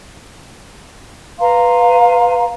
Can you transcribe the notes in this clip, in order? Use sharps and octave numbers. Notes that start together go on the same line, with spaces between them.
B4 F5 A#5 C6